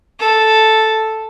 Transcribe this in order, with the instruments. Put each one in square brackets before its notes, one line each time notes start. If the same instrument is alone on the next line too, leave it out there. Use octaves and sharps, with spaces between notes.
[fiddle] A4